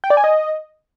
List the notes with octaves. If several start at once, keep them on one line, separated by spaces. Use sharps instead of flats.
G5
D5
G#5
D#5